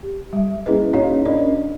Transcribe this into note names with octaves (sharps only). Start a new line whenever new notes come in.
G4
G3 E5
A#3 C#4 E4 G#4 B4 D#5
C#4 D#4 F#4 C#5 D#5 F5
C#4 D4 A#4 D5 D#5
D#5